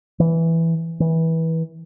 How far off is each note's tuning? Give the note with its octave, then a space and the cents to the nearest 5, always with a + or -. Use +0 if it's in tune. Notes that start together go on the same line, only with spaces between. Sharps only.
E3 +0
E3 -20